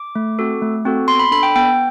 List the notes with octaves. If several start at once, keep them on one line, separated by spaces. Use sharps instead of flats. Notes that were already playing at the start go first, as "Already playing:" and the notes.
Already playing: D6
A3
C4 F#4 A4
A3
C4 F#4 A4
B3 C6
B5
D4 A4 B5
G5
B3 G5